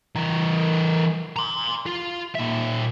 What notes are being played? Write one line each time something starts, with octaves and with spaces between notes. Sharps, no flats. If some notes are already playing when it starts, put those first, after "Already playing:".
E3 A#4
A#5 C6
F4
A#2 E5